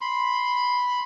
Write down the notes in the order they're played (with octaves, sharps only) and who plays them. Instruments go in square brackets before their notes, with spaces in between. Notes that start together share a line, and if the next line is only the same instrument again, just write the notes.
[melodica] B5 C6